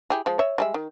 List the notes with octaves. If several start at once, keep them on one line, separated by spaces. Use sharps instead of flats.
E4 G4 G#4
F3 G#3
C#5 E5
G3 G#3 E5
D#3